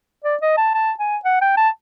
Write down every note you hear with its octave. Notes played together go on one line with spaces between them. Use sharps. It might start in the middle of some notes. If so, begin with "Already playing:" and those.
D5
D#5
A5
A5
G#5
F#5
G5
A5